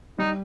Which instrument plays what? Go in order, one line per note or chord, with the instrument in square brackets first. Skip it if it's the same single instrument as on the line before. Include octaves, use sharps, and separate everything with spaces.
[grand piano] G3 [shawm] D#4